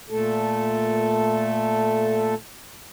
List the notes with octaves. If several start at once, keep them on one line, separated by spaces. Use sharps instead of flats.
A#2 A3 A4